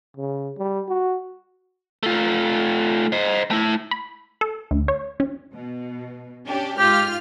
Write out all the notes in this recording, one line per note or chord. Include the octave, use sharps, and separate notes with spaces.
C#3
G3
F#4
A3 F4
C5 D#5
A3 E4
B5
A4
D2
C#5
C#4
B2
C#4 D4 G4
G#2 F4 G4 F6